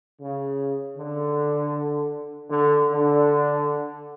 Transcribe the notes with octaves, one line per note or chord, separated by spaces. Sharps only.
C#3
D3
D3
D3